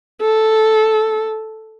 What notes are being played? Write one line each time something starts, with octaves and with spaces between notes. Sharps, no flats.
A4